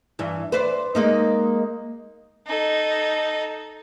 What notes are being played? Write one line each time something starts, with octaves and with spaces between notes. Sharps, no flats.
G2 E3
B4 C5 D5
G#3 A#3 D#4
D#4 A4